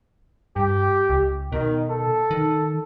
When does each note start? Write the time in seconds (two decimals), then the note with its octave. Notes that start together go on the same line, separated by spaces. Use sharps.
0.56 G2 G4
1.10 C#2
1.52 B2 D#3
1.90 A4
2.31 D#3